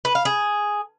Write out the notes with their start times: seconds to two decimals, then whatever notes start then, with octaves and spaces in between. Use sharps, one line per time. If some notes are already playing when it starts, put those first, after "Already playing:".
0.05 B4
0.15 F5
0.25 G#4